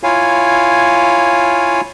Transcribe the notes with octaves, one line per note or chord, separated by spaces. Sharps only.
E4 F4 C#5 F5 G#5